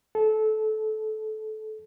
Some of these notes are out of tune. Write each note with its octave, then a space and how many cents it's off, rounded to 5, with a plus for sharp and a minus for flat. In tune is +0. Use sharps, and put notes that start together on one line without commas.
A4 -20